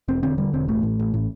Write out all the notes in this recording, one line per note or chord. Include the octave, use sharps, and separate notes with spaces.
E1 C4
D3 C4
D3 G3
E1 C4
A1 A3
A2
A1
A2